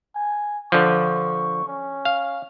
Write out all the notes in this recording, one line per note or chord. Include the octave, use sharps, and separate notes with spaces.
G#5
D3 F3 C#6
C#4
F5